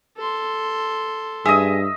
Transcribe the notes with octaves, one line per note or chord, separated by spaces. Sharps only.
A4 C6
G2 G#4 D#5 E5